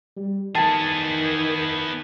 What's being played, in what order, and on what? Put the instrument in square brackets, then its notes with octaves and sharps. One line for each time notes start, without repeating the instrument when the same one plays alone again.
[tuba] G3
[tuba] D#3 [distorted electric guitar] B3 G#4 [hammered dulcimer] A5